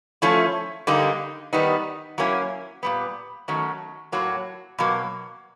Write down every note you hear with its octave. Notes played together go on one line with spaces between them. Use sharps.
F3 A3 C#4 E4
D3 G3 A#3 D#4
D#3 G3 B3 D#4
F#3 A#3 C#4 E4
A#2 G3 B3
D#3 F#3 A3 C#4
A2 F#3 A#3
B2 F#3 A#3